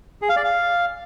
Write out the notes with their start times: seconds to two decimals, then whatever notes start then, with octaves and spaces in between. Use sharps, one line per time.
0.22 G#4
0.29 F5
0.37 D5
0.44 F5